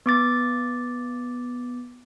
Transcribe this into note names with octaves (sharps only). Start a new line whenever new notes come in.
B3 D6 A6